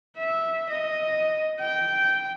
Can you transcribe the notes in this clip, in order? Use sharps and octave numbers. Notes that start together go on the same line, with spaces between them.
E5
D#5
G5